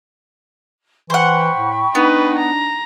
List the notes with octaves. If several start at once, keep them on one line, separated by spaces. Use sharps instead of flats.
E3 C5 F#5 G5 B5 C#6
A2
B3 D4 D#4 B4
A#5